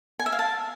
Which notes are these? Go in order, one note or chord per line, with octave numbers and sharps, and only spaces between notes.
G#5
E5
F5
A5